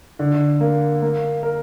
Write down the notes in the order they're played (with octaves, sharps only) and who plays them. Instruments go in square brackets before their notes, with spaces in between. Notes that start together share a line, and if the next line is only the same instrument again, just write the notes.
[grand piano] D3
A#3
A#3
A#4